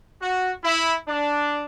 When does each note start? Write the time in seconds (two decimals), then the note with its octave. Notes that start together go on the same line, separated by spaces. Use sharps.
0.21 F#4
0.64 E4
1.07 D4